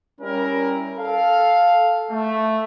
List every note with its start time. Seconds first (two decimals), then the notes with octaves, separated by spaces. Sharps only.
0.21 G3 C#4 E4 A#4
0.98 A4 F5
2.11 A3